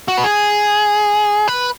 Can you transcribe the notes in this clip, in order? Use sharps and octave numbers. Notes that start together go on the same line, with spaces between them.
F#4
B4
G#4
B4